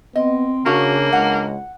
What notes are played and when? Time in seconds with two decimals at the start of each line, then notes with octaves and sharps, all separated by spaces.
0.15 B3 C4 D#5
0.66 C#3 A#3 D4 F#4
1.13 C#2 F#5